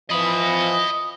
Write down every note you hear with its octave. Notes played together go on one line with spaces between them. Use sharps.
E3 F3 D#5 B5 D#6